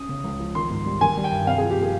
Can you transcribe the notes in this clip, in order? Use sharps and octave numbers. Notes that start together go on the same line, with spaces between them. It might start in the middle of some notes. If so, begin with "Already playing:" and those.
Already playing: C#4 D#6
C#3
C#2
F3
D#3 C6
G#2
G3
D#3 G#5
G3
G5
G2
C3 F5
G#4
F3
G4
A#3 G#4